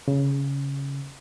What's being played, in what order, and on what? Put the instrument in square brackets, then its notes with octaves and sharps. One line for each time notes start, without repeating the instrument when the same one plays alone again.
[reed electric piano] C#3